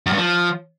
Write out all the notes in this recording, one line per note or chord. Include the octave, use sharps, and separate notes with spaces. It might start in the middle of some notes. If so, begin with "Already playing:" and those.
F#2
G2
F3